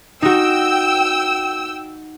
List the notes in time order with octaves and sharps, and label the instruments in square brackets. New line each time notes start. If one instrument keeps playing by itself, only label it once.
[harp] D#4 F#4 [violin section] G5 E6